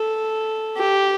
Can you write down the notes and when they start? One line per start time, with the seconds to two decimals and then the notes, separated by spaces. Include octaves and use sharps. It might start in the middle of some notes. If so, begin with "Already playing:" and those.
Already playing: A4
0.77 G4